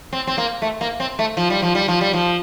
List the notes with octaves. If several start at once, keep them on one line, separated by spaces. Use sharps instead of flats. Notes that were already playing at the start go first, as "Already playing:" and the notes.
C4
C4
A#3
A3
A#3
C4
A3
F3
G3
F3
G3
F3
G3
F3